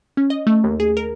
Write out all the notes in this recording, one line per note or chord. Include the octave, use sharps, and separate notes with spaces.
C#4
D#5
A3
D#2
G#4
A#4